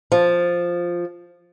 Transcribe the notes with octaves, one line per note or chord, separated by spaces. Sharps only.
F3